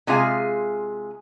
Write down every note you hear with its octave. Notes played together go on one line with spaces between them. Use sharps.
C3 G#3 F4 G#4 F5 G#5